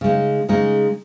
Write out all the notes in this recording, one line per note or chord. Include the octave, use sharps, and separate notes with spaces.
C#3 G#3 D#4
C#3 G#3 D#4